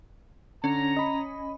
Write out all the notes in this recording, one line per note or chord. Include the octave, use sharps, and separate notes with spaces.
D3 C#4 A#5
D#5 B5